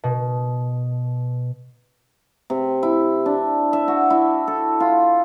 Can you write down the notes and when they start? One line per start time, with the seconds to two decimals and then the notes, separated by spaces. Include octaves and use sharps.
0.04 B2
2.50 C3
2.83 E4
3.26 D4
3.73 E5
3.88 F#4
4.10 E4
4.48 A4
4.80 F4